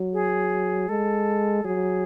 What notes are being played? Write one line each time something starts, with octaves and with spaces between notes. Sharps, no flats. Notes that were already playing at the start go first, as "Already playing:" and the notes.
Already playing: F#3
G#4
G#3 A4
F#3 G#4